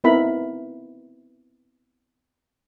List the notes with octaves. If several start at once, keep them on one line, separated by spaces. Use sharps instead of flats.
B3 C4 D#4 E4 A#4 B5